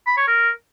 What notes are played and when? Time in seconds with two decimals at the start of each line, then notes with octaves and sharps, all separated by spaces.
0.07 B5
0.17 C#5
0.28 A#4